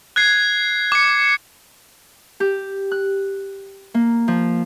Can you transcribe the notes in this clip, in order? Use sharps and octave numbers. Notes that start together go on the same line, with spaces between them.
F#6 G#6 C7
D6 C#7
G4
F#6
A#3
F3